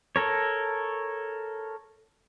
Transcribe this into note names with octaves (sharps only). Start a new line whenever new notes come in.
A4 A#4 C#5